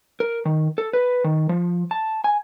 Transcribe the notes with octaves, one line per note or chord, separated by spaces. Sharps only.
A#4
D#3
A4
B4
D#3
F3
A5
G#5